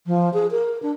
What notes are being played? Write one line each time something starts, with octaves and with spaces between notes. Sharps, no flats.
F3
G#4
A#4
D4